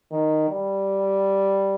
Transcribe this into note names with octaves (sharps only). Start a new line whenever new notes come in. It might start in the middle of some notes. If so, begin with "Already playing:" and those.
D#3
G3